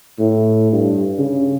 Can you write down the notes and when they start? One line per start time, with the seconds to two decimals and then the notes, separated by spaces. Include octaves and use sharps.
0.19 A2
0.72 G2
1.18 C#3